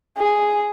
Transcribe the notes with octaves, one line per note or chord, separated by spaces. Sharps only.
G#4